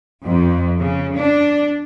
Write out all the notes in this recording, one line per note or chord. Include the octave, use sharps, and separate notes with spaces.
F2
C#3
D4